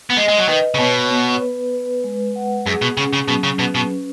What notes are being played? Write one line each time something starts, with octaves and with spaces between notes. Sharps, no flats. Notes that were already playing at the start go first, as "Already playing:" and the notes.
B3
G#3 D#5
G#3
F#3
D#3 B4
C#3
B2 C#5
B3
B4
B4
G#3
F#5
F#2 G#4
B2
C#3 C#4
C#3
B2 F#3
C#3
B2 B4
B2
C#4